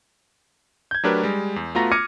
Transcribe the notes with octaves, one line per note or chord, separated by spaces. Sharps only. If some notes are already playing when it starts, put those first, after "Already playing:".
G6 G#6
F#3 A3 D4 G4 A#4 B4
G3 G#3
E2
A3 B3 F4 F#4 A#5 A#6
D6 F6 G#6 A#6 C#7 D#7